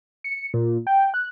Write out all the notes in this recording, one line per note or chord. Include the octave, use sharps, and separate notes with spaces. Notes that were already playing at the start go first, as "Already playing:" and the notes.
C#7
A#2
G5
F#6